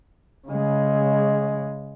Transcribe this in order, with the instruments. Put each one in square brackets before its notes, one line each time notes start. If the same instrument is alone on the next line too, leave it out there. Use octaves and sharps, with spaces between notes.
[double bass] C#3 G#3